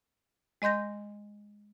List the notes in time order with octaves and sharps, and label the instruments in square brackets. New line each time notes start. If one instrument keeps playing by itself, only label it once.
[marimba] G#3 D#5 C6 G6 A#6